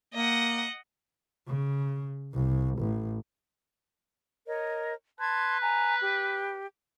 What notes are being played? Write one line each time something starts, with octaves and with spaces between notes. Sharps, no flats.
A#3 D#5 F#5
C#3
C2
A1
A#4 C#5 D#5
B4 A5 C6 G#6
G#5 A#5
G4